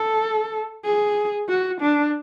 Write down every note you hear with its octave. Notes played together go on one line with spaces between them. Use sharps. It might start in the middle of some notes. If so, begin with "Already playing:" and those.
Already playing: A4
G#4
F#4
D4